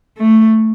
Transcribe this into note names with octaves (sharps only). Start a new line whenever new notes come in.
A3